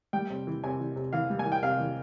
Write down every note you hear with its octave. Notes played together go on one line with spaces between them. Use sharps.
G3 G5
C3
E3
C3 G#5
E3
C3
E3 F5
G3
G#5
E3
G5
C3 F5
E3